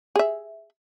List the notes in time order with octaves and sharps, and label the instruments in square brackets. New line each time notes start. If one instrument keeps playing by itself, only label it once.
[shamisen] G#4 E5